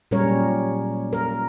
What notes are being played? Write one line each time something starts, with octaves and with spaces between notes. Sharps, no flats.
A#2 F#3 G3 C#4 A#4 C#5
A#4